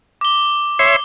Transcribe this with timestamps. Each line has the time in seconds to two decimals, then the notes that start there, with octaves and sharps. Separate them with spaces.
0.21 D6 G7
0.79 C#5 E5 C6